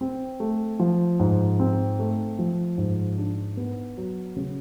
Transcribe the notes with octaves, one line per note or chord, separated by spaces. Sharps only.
C4
A3
F3
G#2
C4
A3
F3
G#2
D4
B3
F#3
C#3